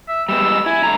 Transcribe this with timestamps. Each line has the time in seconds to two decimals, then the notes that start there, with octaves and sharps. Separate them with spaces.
0.08 E5
0.29 G3 G#3 B3 E6
0.66 E4 G#5
0.84 A2 D3 A#5